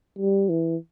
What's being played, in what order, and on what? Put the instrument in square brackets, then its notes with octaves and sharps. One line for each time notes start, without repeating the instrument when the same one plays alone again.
[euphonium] G3
E3